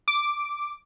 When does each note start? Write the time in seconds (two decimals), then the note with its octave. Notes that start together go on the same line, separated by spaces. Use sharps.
0.08 D6